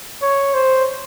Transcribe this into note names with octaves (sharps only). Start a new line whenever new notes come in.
C#5
C5